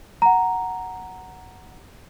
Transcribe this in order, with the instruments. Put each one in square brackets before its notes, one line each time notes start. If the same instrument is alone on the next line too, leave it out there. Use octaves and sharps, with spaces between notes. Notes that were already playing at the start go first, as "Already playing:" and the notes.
[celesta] F#5 A#5